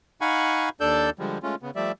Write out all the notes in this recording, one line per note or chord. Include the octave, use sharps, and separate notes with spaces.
D#4 F5 F#5 G#5 B5 C#6
D#2 D4 A4 D5 E6 G6
D3 F3 G3 G#3
G#3 A3 C#4 F4
C#3 B3
F3 G3 A3 D5 E5